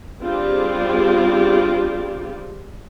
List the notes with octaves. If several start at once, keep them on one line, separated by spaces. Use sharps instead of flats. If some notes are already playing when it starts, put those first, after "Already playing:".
G3 C4 D4 F4 G4 G#4